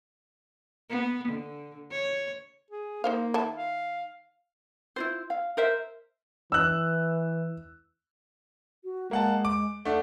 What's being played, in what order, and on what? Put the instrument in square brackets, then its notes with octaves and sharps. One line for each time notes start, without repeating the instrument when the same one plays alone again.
[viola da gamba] B3
D3
C#5
[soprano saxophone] G#4
[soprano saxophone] A#3 [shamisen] D#4 C5 F5
[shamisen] D#3 E4 A5
[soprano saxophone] F5
[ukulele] E4 F4 C5
F5
A#4 C5 E5
[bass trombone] E3 [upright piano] E6 F#6
[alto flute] F#4
[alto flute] G#3 [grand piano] A#3 F#5 A5
[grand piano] D6
[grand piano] A3 D4 [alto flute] F#5